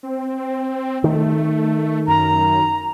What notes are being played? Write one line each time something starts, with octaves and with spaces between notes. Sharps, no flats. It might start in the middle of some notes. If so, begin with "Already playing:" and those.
C4
D#3 A3
F#2 A#5